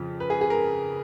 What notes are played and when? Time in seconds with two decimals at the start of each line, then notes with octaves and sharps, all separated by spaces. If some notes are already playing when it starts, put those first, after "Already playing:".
Already playing: F2 C#3 F3
0.20 B4
0.30 G#4
0.41 G#4
0.50 A#4